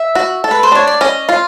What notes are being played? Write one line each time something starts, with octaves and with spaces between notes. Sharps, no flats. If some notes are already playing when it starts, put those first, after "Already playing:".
Already playing: E5
F#4
A4
B4
C5
D4 C#5
D5
C#4 D#5
F4 F5